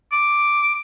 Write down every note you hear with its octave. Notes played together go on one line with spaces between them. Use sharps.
D6